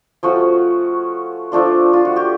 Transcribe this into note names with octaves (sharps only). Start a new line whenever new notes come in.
F3 A3 C#4 F#4
F3 A3 D4 F4
F4
F#4
G4